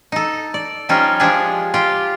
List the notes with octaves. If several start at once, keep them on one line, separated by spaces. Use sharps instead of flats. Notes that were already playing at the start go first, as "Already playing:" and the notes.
D#4 A4
D5
F3 G3 C#4 D#4 F4 G4
F3 G#3 D4 G4 G#4
F4 G4